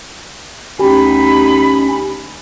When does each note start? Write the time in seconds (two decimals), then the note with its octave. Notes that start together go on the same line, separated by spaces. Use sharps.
0.79 D2 C#4 D#4 G4 B5